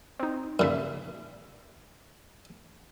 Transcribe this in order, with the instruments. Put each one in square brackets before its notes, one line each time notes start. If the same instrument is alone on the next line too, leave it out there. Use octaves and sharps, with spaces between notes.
[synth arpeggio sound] C4 D#4
[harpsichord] F#2 C#3 [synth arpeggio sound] A#2 E5